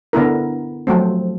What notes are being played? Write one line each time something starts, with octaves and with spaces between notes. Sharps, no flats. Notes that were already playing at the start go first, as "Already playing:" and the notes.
D3 B3 E4 A#4
F3 F#3 A3 C4